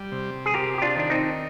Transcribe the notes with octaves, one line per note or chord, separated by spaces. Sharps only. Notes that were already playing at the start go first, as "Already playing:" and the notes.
Already playing: G3
C3
G#4
C3 G4 A#4
G4
D4 F4
D#3 D4
C4 D#4